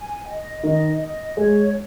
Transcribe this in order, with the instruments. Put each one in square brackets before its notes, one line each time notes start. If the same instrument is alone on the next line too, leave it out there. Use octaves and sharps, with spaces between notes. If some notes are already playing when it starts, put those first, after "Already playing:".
Already playing: [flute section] G#5
D#5
[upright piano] D#3 [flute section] D#5
[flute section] D#5
[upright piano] G#3 [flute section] C#5